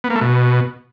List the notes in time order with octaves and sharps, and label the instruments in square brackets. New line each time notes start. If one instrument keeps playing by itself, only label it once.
[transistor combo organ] B3
A#3
A3
B2